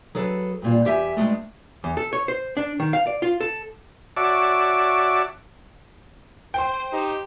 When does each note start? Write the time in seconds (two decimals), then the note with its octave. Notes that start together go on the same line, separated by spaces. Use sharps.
0.15 F#3 G#4 A4 B4
0.62 G2 A#2 F4
0.85 E2 G4 E5 F5 G#5
1.17 G2 F#3 G#3 A3
1.84 E2
1.97 A4
2.13 C#5
2.28 C5
2.57 D4
2.80 D#3
2.93 F5
3.07 D5
3.22 F4
3.41 A4
4.17 F#4 C#5 D5 E5 A5 D6
6.54 C5 G5 C6
6.93 D#4 G4